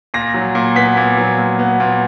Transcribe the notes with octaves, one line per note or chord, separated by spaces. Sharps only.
A#2 A#6
F#3
A#2
B3 B6
A#2
F#3
A#2
B3
A#2